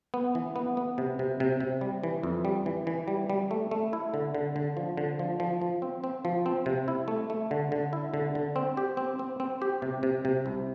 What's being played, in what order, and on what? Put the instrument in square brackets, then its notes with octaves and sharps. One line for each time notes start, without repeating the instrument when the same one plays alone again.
[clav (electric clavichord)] B3
E3
B3
B3
C3
C3
C3
C3
G3
E3
F2
G3
E3
E3
G3
G3
A3
A3
E4
D3
D3
D3
F3
D3
F3
F3
F3
C4
C4
F3
C4
C3
E4
A3
A3
D3
D3
E4
D3
D3
C4
G4
C4
C4
C4
G4
C3
C3
C3
C2